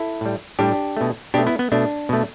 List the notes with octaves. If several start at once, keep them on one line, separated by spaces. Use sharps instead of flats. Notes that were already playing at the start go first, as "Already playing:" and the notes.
Already playing: E4 A4
A2 G3
A2 G3 D4 G4
B2 A3
B2 A3 D4 G4
B3 E4
B3
B2 A3 D4
B2 A3